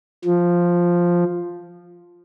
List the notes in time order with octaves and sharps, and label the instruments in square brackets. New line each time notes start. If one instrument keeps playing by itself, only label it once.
[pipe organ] F3